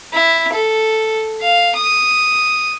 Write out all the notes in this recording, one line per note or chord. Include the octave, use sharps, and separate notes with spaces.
E4
A4
F5
D#6